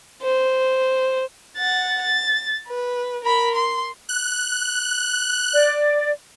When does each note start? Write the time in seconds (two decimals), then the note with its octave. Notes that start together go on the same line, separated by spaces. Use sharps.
0.22 C5
1.57 F#5 A6
2.02 A6
2.68 B4
3.25 A#4 B5
3.55 C6
4.09 F#6
5.54 D5